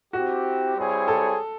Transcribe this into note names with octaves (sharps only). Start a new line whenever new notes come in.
C4 E4 F#4 G4
G3 C4 E4 G#4 C#5
A4